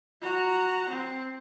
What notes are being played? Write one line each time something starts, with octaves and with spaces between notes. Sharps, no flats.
F#4 A#5
C4